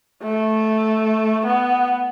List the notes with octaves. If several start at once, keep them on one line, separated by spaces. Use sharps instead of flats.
A3
B3